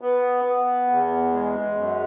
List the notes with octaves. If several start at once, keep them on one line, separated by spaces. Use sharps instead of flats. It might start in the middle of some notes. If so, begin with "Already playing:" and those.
B3
B3
E2
G#3
F#2